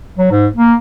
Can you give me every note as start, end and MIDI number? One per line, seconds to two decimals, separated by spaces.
0.19 0.29 54
0.31 0.47 44
0.56 0.74 58